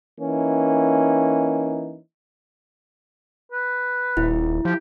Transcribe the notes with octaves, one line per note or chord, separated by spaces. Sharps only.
E3 A#3 C#4 D#4
B4
D#1 E4
F3 G4